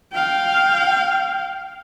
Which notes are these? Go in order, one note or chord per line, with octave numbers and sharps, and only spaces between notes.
F5 G5